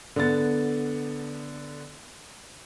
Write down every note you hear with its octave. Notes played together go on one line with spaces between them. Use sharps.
D3 B3 A6